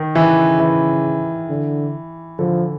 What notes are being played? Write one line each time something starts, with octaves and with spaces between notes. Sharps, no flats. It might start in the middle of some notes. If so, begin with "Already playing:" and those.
Already playing: D#3
C#3 E3
E3
D3
D3 F3